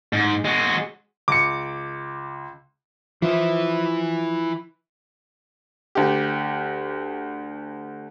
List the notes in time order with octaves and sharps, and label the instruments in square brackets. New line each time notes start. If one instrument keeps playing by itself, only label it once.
[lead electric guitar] G#2
G#3 F#4
[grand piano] C#2 C#7 [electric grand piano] D6
[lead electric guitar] E3 E4 [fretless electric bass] F3
[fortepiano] D2 G4